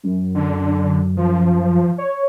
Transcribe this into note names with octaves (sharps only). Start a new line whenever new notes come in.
F#2
D3
F3
C#5